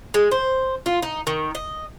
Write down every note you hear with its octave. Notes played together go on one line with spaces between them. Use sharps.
G#3
C5
F4
D#4
D#3
D#5